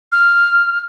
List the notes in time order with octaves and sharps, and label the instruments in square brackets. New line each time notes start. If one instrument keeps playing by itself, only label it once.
[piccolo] F6